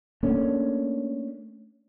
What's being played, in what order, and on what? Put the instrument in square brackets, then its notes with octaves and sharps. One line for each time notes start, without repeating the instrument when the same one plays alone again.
[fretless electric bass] A3 A#3 C#4 D4